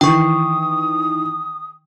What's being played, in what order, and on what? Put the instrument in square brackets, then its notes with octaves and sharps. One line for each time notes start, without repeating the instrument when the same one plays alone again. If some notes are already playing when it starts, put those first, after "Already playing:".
[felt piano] D#3 E3 [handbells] G5 C#6 [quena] D#6